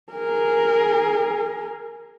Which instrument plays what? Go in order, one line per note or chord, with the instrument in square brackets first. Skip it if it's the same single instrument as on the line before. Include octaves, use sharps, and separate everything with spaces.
[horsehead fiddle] G#4 A#4